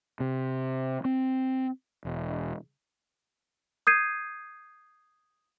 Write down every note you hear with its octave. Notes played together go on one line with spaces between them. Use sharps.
C3
C4
E1
D#6 G6 G#6 C7 D#7